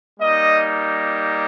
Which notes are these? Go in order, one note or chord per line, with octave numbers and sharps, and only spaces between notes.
G3 A#3 D#4 D#5